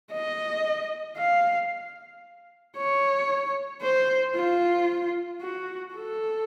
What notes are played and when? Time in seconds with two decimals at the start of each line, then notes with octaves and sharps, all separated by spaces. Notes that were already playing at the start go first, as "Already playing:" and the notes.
0.12 D#5
1.18 F5
2.77 C#5
3.82 C5
4.35 F4
5.42 F#4
5.94 A4